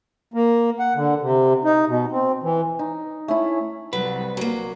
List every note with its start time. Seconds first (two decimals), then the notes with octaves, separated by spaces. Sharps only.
0.34 A#3
0.79 F#5
0.95 D3
1.21 C3
1.64 D#4
1.87 B2
2.11 C4
2.43 E3
2.79 D#4
3.28 A3 C#4 E4
3.93 C2 F#3 B4
4.37 F#3 A#3